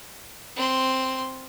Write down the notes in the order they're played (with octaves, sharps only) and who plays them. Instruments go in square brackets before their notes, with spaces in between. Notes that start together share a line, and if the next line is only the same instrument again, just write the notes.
[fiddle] C4 C6